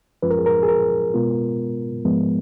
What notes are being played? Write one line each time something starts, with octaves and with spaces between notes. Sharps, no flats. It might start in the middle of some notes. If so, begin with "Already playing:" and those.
F#2 F3 G#3 C#4 F4 B4
A#4
G#4
A#4
G#4
A#4
B2 G#3 B3 F4
G#2 F3 G#3 B3